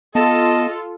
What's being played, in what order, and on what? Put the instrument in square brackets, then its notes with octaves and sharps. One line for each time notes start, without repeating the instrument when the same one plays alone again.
[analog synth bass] B3 [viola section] F4 A4 [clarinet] D#5 [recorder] A5